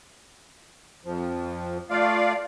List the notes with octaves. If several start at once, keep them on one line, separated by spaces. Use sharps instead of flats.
F2 F3
A3 F4 D5 F5